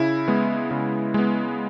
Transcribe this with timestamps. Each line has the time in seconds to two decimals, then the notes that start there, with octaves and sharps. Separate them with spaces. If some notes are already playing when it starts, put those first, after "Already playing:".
Already playing: C#3 E4
0.28 G#3 B3
0.71 C#3
1.14 G#3 B3